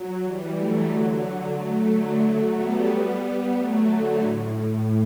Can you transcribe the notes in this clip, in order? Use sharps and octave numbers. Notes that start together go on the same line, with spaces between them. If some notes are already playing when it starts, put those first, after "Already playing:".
Already playing: F#3
E3 G3
F#3 A3
D3 F#3
F#3 A3
D3 F#3
F#3 A3
G3 B3
G3 B3
F#3 A3
D3 F#3
A2